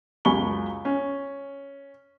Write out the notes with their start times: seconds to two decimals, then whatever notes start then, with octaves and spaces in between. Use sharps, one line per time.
0.25 C#2 F#2 G#5 B5 C#6 G7
0.85 C#4